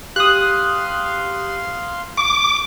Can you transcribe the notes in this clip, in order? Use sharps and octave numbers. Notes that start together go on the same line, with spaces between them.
G4 F5 C6 D#6 F#6
C#6 D6